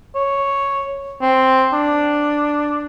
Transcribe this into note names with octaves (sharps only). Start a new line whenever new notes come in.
C#5
C4
D4